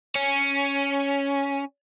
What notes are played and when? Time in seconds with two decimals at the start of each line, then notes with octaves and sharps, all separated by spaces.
0.16 C#4